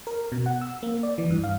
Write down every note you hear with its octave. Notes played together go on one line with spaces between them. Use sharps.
A#4
B2
F#5
E6
A#3
D5
E3
G2
F5